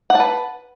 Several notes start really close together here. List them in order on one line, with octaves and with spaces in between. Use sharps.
F#5 A5 B4